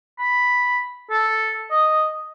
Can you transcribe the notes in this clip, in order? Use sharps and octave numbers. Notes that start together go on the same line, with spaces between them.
B5
A4
D#5